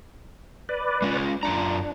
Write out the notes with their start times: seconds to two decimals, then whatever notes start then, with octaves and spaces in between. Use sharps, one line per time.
0.69 B4 D5
1.02 G#3 C#4 F4
1.43 F#2 D4 F4 A#5